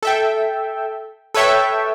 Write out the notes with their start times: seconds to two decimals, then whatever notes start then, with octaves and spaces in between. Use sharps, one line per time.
0.03 A4 E5 G5
1.34 A4 B4 C#5 E5 G5